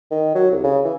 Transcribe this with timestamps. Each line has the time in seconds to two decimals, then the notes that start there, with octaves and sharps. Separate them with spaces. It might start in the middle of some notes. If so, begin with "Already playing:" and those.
0.11 D#3
0.35 F#3
0.51 C2
0.64 C#3
0.85 E3